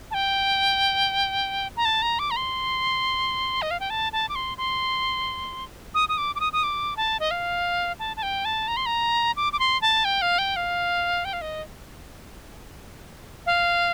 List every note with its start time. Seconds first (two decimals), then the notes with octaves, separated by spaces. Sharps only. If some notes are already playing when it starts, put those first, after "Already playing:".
0.11 A5
0.14 G5
1.76 A#5
1.85 A5
2.02 A#5
2.19 D6
2.31 A#5
2.36 C6
3.62 D#5
3.71 F5
3.80 G5
3.90 A5
4.12 A5
4.29 D6
4.35 C6
4.58 C6
5.94 D#6
6.09 D#6
6.18 D6
6.35 D6
6.40 D#6
6.53 D#6
6.63 D6
6.97 A5
7.20 D#5
7.31 F5
7.99 A5
8.16 A5
8.23 G5
8.45 A5
8.68 A#5
8.77 C6
8.86 A#5
9.36 D6
9.53 D6
9.59 C6
9.81 A5
10.05 G5
10.22 F5
10.38 G5
10.56 F5
11.25 G5
11.33 F5
11.41 D#5
13.46 F5